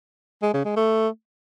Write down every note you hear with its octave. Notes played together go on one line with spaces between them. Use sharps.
G#3
C#3
G#3
A3